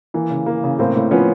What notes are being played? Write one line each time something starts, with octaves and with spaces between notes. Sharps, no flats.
E3 A#3
C#3
E3 A#3
C#3
A2 A#3 C4
A2
F3 B3 C#4